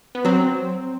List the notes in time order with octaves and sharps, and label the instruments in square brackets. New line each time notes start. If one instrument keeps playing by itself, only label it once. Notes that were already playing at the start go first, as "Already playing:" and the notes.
[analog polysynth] B3
[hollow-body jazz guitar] F#3 [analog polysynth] C4